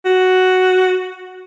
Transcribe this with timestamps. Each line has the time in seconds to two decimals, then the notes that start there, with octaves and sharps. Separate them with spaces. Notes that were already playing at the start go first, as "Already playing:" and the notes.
0.05 F#4